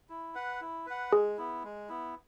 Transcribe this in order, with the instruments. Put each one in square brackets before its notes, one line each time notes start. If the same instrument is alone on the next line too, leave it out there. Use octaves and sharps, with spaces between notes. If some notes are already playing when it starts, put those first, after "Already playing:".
[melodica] E4
B4 F#5
E4
B4 F#5
[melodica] G#3 [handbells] G#4
[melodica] B3 E4
G#3
B3 E4